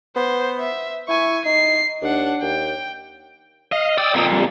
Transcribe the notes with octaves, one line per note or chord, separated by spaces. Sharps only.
B3 C5
E5
E4 G#5 C#6
D#4 C7
D#2 D4 F#5
D#2 G5
D#5 F5
D5 G5 D#6 E6
F2 A#2
G3